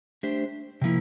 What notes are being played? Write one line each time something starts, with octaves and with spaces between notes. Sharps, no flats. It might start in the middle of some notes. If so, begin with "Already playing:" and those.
A3 D4 G4 C5
C3 F3 A#3 E4